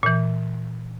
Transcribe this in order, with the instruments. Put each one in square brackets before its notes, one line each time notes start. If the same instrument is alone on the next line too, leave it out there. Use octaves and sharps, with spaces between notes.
[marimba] A#2 E3